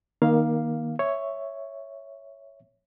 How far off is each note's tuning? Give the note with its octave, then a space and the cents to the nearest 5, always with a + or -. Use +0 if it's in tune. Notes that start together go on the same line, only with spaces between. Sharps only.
D#3 +0 A#3 +20 F5 +0
C#5 +0 E5 +0